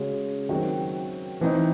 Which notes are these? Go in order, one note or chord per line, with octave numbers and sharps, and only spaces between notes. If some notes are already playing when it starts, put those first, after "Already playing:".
Already playing: C#3 G#3 C#4 F#4
D#3 F#3 C4 F#4
E3 C4 D#4